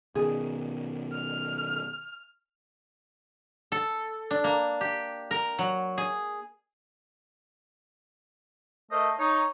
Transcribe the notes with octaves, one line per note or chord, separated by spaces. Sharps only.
B2 D#3 G#4
F6
A4
D4
A#3
G4
A#4
F#3
G#4
A3 A#4 C5 D#5
D#4 C#5